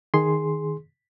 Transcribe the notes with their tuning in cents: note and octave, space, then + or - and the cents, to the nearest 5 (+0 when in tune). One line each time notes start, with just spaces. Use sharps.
D#3 +0 G#4 +0 C6 +0